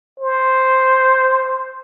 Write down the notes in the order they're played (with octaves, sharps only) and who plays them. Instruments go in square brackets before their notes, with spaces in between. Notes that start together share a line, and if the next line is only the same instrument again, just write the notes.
[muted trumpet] C5